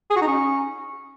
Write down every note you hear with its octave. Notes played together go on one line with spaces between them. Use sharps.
G#4
F#4
D#4
C#4